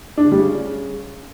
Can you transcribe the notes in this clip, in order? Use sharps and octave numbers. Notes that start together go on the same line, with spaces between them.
D4
D3
G3
C#3